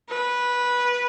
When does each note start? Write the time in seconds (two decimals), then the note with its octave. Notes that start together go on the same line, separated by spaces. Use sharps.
0.09 B4